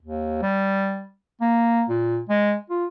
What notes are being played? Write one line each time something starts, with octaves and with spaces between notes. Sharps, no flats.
D#2
G3
A#3
A#2
G#3
F4